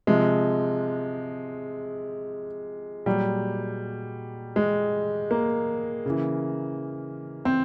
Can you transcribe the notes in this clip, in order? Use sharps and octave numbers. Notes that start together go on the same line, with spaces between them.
C3 F3 G#3
A#2 F#3 G3
G#3
A#3
C#3 E3
C4